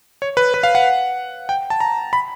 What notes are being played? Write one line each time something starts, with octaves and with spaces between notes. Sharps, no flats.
C#5
B4
B4
F5
F#5
G5
A5
A#5
B5